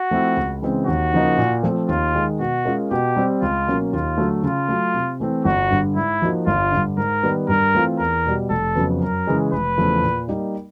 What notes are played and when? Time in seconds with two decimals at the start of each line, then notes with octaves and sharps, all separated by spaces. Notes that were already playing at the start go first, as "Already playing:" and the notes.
Already playing: F#4
0.11 F3 A3 C4 E4
0.37 C#2
0.62 C#3 E3 G#3 C4
0.87 D#2 F#4
1.13 C#3 F3 A#3 D#4
1.38 A#2
1.63 F3 A3 C4
1.88 D#2 F4
2.15 D#3 G#3
2.40 B2 F#4
2.65 G#3 C#4 F4 A#4
2.91 B2 G4
3.16 G3 C4
3.42 C#2 F4
3.67 B2 F#3 A#3 C#4
3.93 D#2 F4
4.18 D3 F#3 A3
4.44 C#3 F4
4.69 F#3 A3
4.94 C3
5.20 E3 A3 C4
5.45 G1 F#4
5.70 G2 D3
5.96 G#2 E4
6.22 F3 A#3 D#4 F#4
6.47 G1 F4
6.72 G2 D3
6.97 G#2 A#4
7.23 D#3 G3 B3
7.49 G2 A#4
7.74 E3 A3 C4 F4
7.99 E2 A#4
8.26 B2 G3
8.50 F1 A4
8.75 F2 C#3 F#3 B3
9.01 F#2 A#4
9.27 C#3 E3 G#3
9.52 F1 B4
9.78 E2 C#3 F3 A3
10.03 A#2
10.28 G3 A#3 D#4